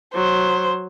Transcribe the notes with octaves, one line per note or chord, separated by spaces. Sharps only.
F#3 C5